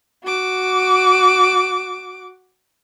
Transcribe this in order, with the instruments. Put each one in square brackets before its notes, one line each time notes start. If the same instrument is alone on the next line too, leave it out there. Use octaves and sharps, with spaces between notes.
[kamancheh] F#4 D6